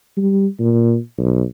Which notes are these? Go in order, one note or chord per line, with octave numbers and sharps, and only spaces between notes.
G3
A#2
B1